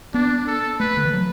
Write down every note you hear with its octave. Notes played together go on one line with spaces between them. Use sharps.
B3 D4
A4
A3 B4
D3
E3
F#3